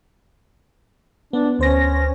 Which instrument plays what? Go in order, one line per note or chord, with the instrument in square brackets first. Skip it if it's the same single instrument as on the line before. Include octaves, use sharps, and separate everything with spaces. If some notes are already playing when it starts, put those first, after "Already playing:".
[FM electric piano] B3 [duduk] D4
[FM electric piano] D2 C5 A#6 [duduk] C#4